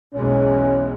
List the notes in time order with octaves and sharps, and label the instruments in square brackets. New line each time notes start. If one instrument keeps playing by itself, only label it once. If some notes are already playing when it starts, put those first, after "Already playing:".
[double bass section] B1 E2 G#3 [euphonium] C#4